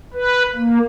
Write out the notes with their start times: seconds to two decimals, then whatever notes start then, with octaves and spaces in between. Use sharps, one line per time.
0.14 B4
0.55 A#3